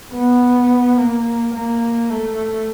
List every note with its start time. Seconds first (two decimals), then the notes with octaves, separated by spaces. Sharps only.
0.13 B3
0.97 A#3
1.54 A#3
2.10 A3